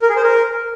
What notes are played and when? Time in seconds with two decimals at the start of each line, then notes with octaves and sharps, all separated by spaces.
0.02 A#4
0.09 G#4
0.16 C5
0.23 A#4